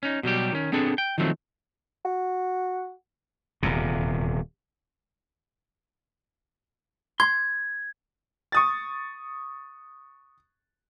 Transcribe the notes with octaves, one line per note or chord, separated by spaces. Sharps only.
C#4 D#4
B2 F#3 G3 G4
D#3 C#4
B3 C4 D4 G#4 A4
G5
D#3 F3 F#3 A3 C4
F#4
D#1 E2 C3
C6 G#6
C#6 D#6 A6